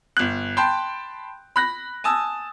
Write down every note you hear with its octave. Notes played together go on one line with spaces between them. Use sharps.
G1 F#6
G5 A5 B5 C6 G6
B5 F#6 A#6
G#5 A5 D#6 E6